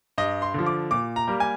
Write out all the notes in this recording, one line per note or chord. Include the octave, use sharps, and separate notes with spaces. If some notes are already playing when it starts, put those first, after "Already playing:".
G2 D#5
C6
D3 F3
D6
A#2 D6
A#5
G3 A#3
G#5